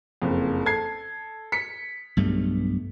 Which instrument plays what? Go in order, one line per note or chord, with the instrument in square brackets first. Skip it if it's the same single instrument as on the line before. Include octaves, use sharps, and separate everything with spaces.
[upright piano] F#1 F2
A4 G#6 C7
B6 C#7
[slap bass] B1 G2 A3